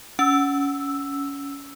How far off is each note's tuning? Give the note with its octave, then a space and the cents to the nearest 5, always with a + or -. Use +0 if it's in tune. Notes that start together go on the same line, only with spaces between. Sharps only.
C#4 +20 E6 +0